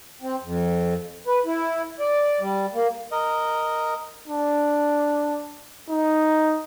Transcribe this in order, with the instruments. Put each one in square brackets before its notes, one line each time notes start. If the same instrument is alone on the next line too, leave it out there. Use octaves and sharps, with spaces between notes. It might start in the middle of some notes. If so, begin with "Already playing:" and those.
[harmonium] C4
F2
B4
E4
D5
G3
A#3
[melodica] A#4 D#5
[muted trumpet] D4
D#4